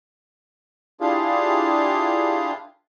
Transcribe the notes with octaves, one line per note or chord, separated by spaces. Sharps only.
D4 E4 F4 G4 G#4 F5